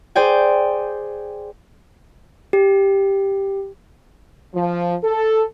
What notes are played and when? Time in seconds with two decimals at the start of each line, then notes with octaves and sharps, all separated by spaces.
0.15 G#4 C5 D5 G5 G#5
2.53 G4
4.55 F3
5.03 A4